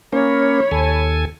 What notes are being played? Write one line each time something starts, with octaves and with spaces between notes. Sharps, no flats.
A#3 C#4 C#5 B5
D#2 A4 G#5